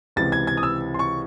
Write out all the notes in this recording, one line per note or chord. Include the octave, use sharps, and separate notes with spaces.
C#2 C3 E3 A6
G#6
G#6
D#6
E6
C6
C#6